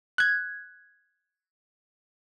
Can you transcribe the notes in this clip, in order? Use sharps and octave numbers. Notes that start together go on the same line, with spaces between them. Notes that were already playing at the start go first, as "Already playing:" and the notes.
F#6 G#6